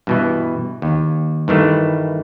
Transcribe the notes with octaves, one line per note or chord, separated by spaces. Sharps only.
G2 B2 E3
D#2
G2 D#3 E3 A3